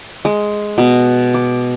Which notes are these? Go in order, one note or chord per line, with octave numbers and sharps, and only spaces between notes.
G#3
B2
D6